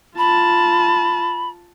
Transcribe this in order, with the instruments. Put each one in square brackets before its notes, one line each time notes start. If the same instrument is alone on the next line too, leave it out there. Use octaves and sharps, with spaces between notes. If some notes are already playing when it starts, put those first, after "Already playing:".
[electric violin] F4 A5 [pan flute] B5